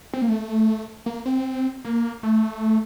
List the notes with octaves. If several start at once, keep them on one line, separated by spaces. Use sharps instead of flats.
C4
A#3
A3
A#3
C4
A#3
A3